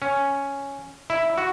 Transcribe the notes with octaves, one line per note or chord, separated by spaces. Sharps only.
C#4
E4
F#4